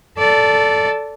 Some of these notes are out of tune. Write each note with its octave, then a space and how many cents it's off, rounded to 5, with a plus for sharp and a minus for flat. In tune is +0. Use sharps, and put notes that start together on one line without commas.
A4 +0 D5 -20